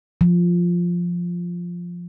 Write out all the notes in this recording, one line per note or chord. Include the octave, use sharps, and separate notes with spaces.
F3